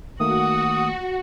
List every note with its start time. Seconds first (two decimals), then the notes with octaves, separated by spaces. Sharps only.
0.20 D#3 A3 A#3 F#4 D#6